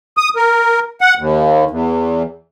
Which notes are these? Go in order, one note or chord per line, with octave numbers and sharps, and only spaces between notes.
D#6
A#4
F#5
D#2
E2